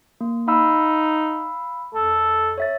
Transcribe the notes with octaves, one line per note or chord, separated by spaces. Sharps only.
A#3
D#4 F5 B5 E6
F2 A4
C#5 E5 A6